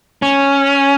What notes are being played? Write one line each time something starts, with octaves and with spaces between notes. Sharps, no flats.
C#4